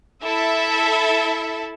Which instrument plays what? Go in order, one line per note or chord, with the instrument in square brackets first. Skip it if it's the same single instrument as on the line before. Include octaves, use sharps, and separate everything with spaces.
[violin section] E4 A4 E5